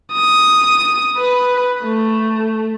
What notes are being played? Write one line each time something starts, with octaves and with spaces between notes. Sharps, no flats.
D#6
B4
A3